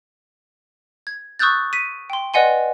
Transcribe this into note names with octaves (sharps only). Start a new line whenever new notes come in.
G#6
C#6 D#6 E6 F#6 G6 A6
B6 D#7
G5 C6
B4 D5 D#5 F#5 G#5 C6